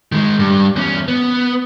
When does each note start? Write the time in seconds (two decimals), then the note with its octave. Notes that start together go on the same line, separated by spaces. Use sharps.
0.12 D#3 G#3
0.39 G2
0.76 E2 C#4
1.08 B3